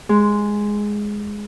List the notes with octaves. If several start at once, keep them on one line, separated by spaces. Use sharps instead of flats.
G#3